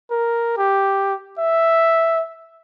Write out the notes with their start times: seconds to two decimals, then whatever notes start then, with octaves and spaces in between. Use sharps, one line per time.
0.11 A#4
0.58 G4
1.38 E5